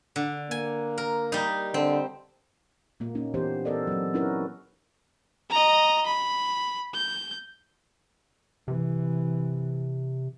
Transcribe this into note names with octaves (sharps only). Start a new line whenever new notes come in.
D3
A#3 G#5
A#4
G3 D#4
D3 C4
A#2 A#3
A#3 C#4 D#4
E3 B3 G4 C5
B3 A4 A#4 D5 D#5
F#3 C4
C#4 D#4 E4 F#4 A#4 B4
D#5 A#5
B5
G6
C3 E3